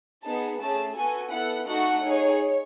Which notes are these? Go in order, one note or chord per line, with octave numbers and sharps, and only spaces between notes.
B3 D#4 G#4 A5
A3 C#4 G#4 A5
B3 F#4 A4 G#5
B3 E4 A4 F#5
A3 D#4 F#4 A4 F#5
D#4 G#4 C#5